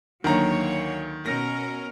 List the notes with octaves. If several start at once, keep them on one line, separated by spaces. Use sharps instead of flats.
D2 D3 D#3 F#3 A#3 C#5 A#5
B2 C#4 A#4 A#6